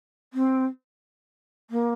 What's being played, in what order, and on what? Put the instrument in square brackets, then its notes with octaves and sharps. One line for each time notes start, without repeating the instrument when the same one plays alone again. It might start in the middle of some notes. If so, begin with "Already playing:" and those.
[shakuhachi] C4
A#3